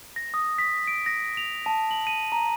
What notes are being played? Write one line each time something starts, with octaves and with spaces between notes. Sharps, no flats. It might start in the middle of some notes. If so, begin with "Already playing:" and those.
A#6
D#6
B6
D7
A#6
F7
A5
F#7
D#7
A#5